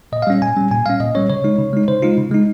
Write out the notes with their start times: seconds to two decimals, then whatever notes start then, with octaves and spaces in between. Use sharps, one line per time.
0.12 A#2 D#5
0.22 F5
0.27 G3 C#4
0.42 A#2 G#5
0.57 G3 C#4
0.71 A#2 G#5
0.86 G3 C#4 F5
1.00 A#2 D#5
1.15 G3 C#4 C#5
1.30 C#3 C#5
1.44 G#3 D#4
1.59 C#3
1.73 G#3 D#4
1.88 C#3 C5
2.03 G#3 D#4 F4
2.18 C#3
2.32 G#3 D#4